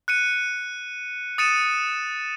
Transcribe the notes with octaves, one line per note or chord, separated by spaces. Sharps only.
F#6 C#7 D#7
D#6 A6 C#7 D#7 E7